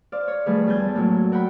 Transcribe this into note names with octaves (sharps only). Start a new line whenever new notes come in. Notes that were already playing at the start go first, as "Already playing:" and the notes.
C5 D5 F5
C#5
D#3 F3 G3 A3 G#4 B4
E2 G3 B3 G#5 A5 G6
A2 F#3 A#3 D4
A#4 F#5 G5 B5